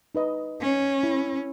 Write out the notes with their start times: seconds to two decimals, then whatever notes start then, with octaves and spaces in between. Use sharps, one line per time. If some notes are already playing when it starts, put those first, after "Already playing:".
0.15 D#4 B4 D#5
0.61 C#4
1.03 E4